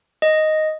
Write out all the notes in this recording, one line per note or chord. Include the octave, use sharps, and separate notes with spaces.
D#5